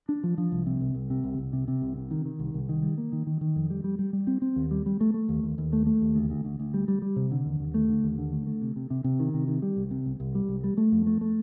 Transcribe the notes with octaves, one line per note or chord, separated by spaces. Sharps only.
D4
F3
F3
C2
C3
C2
C2
C3
C2
C2
C3
C3
C2
C3
D#3
D#3
C2
C2
D#3
G3
A#3
D#3
D#3
D#3
F2
G3
G3
G3
G3
C4
C4
D#2
G3
G3
A3
A3
D#2
D#2
D#2
A3
A3
D#2
D2
D2
D2
D2
G3
G3
G3
C3
D3
D#2
D#2
A3
D3
D#2
D3
A3
A3
C3
C3
C3
C3
D#3
C3
D#3
G3
C2
C3
C2
C2
G3
C2
G3
A3
F2
A3
A3